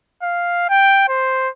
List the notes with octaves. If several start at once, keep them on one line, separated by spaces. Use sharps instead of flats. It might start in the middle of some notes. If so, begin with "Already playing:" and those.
F5
G5
C5